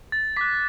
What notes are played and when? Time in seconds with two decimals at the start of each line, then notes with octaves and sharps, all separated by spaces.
0.12 A6
0.37 D6 F#6 B6